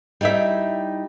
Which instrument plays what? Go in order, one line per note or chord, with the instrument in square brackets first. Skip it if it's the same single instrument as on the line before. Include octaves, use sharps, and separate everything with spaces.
[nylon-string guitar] G3 D#4 E4 D5 E5